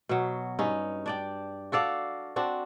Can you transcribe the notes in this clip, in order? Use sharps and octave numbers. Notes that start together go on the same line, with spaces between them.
B2 F#3
G2 C#4 D#4
D4 D5 G5
F#4 A4 D5 F5
C4 D4 F#4